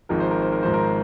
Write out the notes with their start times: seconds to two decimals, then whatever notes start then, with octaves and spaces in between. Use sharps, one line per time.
0.09 G#1 G#2 F3 A#4
0.20 C5
0.31 A#4
0.42 C5
0.52 A#4
0.63 G#1 G#2 F3 C5
0.74 A#4
0.84 C5